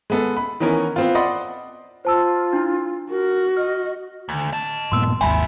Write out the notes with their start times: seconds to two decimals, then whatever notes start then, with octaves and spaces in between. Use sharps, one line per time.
0.10 G#3 B3 A4
0.37 B5
0.60 D#3 E3 B3 C#4 A#4
0.96 B3 C4 F4
1.15 D5 D#5 F#5 B5 C6
2.05 F4 C5 A5 E6
2.53 D4 E4
3.10 F#4 A#4
3.57 D#5 F6
4.29 D2
4.53 D#5 A5
4.92 G2 A#2 B3 C6 E6
5.21 G#1 D#2 G#3 E5 G#5 B5